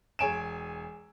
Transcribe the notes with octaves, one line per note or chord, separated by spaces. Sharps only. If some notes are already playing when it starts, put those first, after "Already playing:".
E1 C#5 G#5 D7 E7